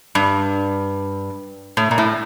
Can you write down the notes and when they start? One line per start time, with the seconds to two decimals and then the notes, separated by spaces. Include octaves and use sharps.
0.15 G2
1.77 A2
1.91 A#2
1.98 A2